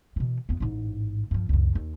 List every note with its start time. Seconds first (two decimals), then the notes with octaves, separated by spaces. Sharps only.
0.16 B2 E3
0.49 E2 B3
0.60 A1 G#2
1.31 G2 F3
1.49 C#2 F#2
1.75 D#2